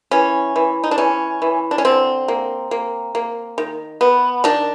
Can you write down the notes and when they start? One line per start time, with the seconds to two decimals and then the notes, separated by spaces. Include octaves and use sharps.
0.11 E3 C#4
0.56 E3
0.84 D#4
0.91 D4
0.98 E3 C#4
1.42 E3
1.71 D4
1.78 C#4
1.85 D3 C4
2.28 A#3
2.71 A#3
3.15 A#3
3.58 D#3
4.01 B3
4.44 D#3 D4